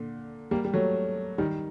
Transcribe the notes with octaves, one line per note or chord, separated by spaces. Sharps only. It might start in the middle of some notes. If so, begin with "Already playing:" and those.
Already playing: A#2 D3
G3 A#3
G3
F#3 A3
D#3 G3